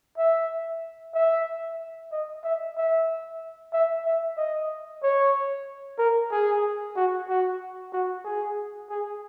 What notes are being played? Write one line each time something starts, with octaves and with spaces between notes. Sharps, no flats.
E5
E5
D#5
E5
E5
E5
E5
D#5
C#5
A#4
G#4
F#4
F#4
F#4
G#4
G#4